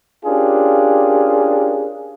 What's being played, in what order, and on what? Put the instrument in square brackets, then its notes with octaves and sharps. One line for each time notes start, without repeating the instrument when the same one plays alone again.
[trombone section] C#4 D4 F4 G4 G#4 A#4